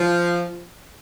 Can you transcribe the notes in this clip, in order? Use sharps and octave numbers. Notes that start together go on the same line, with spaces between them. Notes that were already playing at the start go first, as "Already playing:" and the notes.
Already playing: F3